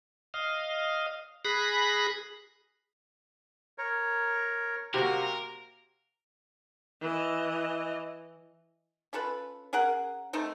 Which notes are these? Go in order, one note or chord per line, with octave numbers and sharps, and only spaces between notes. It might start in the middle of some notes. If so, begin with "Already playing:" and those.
D#5 F5
G#4 B5 F#6 A#6
A#4 C#5
C3 A#3 F#4 A#4
E3 D#5
C#4 F4 A4 B4
C#4 G#4 A#4 F#5
A3 C4 D#4 A4